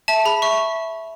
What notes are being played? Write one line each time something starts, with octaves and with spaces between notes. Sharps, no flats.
E5 A5
G#4 B5
E5 C#6